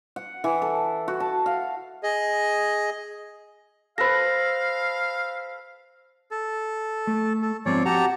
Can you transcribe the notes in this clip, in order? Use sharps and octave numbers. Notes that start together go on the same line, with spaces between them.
F#5
E3
A4
F#4
A5
F5
G#4 D#5
A4 B4 C5 F5 A#6
A4
A3
A4
G#2 F3 C4 C#5 D5
F#4 G4 A5 A#5